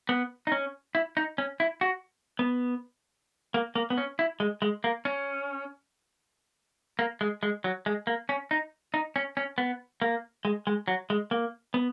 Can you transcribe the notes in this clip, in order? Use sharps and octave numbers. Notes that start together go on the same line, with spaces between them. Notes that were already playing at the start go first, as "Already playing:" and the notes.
B3
D#4
C#4
E4
D#4
C#4
E4
F#4
B3
A#3
A#3
B3
C#4
E4
G#3
G#3
A#3
C#4
A#3
G#3
G#3
F#3
G#3
A#3
C#4
D#4
D#4
C#4
C#4
B3
A#3
G#3
G#3
F#3
G#3
A#3
B3